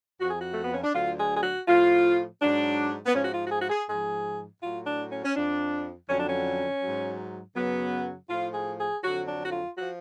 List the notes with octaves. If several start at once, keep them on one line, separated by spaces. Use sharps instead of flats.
F2 F3 F#4
G#4
F#4
A3
B3
C#4
D4
D2 D3 F#3 F4
G#4
G#4
F#4
A2 F3 F4
G#2 F#3 D4
B3
G#2 F3 C#4
F#4
F4
F#4
G#4
F#4
G#4
G#2 F3 G#4
A2 F#3 F4
D4
C#4
C#4
F2 F3 D4
F2 D3 F#3 C#4
D4
C#4
G#2 F#3
F#2 C#3 F#3 B3
A2 F3 F4
G#4
G#4
F2 D3 F#3 F#4
D4
F#4
F4
F3 F#4